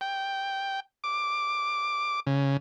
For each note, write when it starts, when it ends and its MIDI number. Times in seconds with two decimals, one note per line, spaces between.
0.01 0.80 79
1.04 2.20 86
2.27 2.57 49